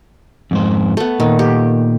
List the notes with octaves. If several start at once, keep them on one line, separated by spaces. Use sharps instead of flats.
F2 G#2 C5
A3 B3
A#2 D#3
G4